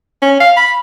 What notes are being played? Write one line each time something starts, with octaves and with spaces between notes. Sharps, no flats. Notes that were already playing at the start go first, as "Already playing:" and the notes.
C#4
F5
B5